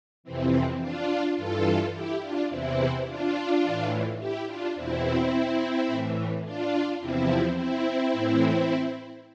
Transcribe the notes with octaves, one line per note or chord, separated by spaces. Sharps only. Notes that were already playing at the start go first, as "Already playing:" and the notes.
F2 C3 E3 C4
D4 F4
G2 E3 F4 A4
E4 G4
D4 F4
E2 C3 E3 C4 E4
D4 F4
A2 E3
E4 G4
D4 F4
E2 B2 C4 E4
A2 E3
D4 F4
E2 C3 F3 C4 E4
C4 E4
A2 E3